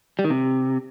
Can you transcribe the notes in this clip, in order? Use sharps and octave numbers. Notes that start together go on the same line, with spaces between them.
G3
D#3
C3